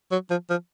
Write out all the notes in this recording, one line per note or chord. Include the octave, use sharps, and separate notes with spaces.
F#3
F3
F3